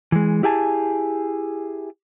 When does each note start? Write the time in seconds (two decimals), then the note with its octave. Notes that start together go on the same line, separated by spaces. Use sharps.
0.12 E3 G#3
0.43 E4 G4 G#4 G#5 A5